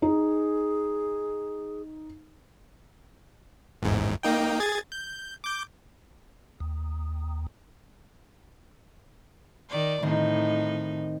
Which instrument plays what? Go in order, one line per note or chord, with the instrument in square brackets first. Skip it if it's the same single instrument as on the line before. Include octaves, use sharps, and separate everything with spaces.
[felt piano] D#4 [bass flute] G#4
[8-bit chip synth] G#1 E2 G#2
A#3 D#4 G5
G#4 G#6 A6
G6
D6 G6
[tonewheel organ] D#2
[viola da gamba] D#3 D5
[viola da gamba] A2 D#4 [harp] D#3 C4